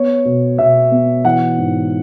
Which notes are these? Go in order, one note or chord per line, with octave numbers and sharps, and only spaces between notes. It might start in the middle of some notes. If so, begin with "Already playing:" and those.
Already playing: B3 C#5
B2
B2 E5
B3
E3 F#5
G#2